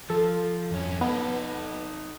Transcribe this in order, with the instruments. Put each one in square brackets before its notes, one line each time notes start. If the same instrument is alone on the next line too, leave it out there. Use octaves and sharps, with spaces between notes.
[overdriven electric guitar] F3 [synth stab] A4
[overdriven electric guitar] F2 C#4
[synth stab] B3 [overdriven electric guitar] D#4 A4